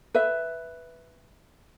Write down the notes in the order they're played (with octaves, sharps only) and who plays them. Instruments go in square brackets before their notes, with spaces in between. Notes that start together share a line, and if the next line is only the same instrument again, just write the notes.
[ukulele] B4 E5